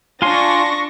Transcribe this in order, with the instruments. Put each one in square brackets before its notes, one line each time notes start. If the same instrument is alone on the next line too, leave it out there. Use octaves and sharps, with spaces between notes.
[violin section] D4 C#6 A#6 [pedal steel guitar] F4 G#5 C6